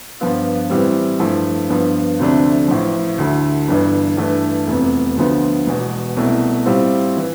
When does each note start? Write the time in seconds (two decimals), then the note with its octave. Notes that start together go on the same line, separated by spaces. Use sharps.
0.20 G2 F3 B3 F4
0.70 A2 E3 G3 C4
1.20 G2 F3 A3 E4
1.70 G2 F3 B3
2.19 D2 C3 F3 A3 D4
2.68 A1 A2 F3
3.18 D2 D3 A3 E4
3.68 G1 G2 E3
4.17 G2 E3 A3
4.67 F1 E2 C3
5.17 D2 D3 F3 B3
5.67 E1 E2 B2
6.17 C2 B2 A3 E4
6.66 A2 G3 C4 F4
7.17 E3